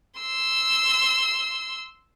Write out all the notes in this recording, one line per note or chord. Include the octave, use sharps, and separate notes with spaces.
C6 E6